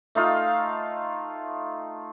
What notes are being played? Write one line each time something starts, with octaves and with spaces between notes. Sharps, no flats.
A3 D#4 F4 F5